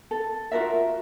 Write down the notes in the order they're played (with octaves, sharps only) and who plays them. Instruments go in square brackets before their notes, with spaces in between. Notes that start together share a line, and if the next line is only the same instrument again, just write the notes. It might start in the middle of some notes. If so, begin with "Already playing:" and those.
[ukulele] A4
F4 F#4 A#4 E5